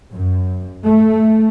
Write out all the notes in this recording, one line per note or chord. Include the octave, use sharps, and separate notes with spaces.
F#2
A3